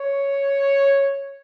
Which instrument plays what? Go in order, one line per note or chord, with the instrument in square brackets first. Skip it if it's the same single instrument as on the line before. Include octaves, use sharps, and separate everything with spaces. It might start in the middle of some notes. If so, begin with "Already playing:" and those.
Already playing: [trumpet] C#5